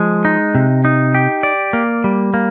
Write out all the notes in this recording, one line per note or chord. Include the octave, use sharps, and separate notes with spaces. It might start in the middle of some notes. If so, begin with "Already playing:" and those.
Already playing: F3 G#3
D#4
C3
D#4
G4
D5
A#3
G3
A#3